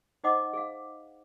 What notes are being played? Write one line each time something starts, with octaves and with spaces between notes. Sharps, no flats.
D#4 C5 D#5 F#5 D6
G#4 F5